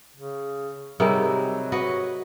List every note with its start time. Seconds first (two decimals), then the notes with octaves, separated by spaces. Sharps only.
0.16 C#3
1.00 C3 F#3 G3 D#4 G#4 A#4 G#5
1.72 F#4 B4 D#5